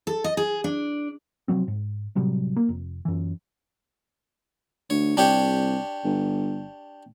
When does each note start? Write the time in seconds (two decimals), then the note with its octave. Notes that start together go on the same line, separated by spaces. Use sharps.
0.07 A4
0.24 D#5
0.37 G#4
0.64 D4
1.48 C3 F3 F#3 C4
1.68 G#2
2.15 A2 C3 F#3 G3
2.56 A#3
2.69 F1
3.05 F#2 E3
4.90 D2 C#5
5.17 C2 D4 G4 C#5
6.04 G1